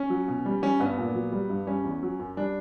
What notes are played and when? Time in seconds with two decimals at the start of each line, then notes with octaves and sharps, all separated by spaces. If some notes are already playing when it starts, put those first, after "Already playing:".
Already playing: C#4
0.10 F#3
0.28 B2
0.46 G3
0.62 G3 C#4
0.80 G2 B3
0.98 A#2
1.14 F#3
1.32 G3
1.50 G2
1.67 G3 C#4
1.84 E2
2.03 F#3
2.19 F#2
2.37 G3 D4